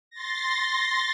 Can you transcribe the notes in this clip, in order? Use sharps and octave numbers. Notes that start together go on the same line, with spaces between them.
C6 A6 A#6